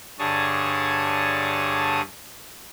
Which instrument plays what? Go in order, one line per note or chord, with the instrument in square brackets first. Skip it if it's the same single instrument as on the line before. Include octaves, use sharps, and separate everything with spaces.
[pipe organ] G2 D3 G#4 C#5 A5 D#6